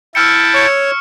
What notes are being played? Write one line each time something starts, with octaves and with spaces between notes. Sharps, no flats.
E4 G5 A5 E6 F6 C#7
C#5 C#6 C#7